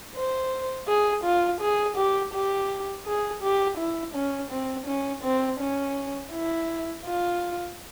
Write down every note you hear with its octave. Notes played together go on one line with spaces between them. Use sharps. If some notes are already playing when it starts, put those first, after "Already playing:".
C5
G#4
F4
G#4
G4
G4
G#4
G4
E4
C#4
C4
C#4
C4
C#4
E4
F4